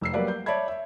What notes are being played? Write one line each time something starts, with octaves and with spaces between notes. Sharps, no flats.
F1 E6 C7
F#3 G3 A#3 B4 D5 F5
G6
C#5 D5 E5 A5 B5 G#6
E5